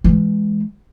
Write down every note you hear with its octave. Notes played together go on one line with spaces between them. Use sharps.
E3 G#3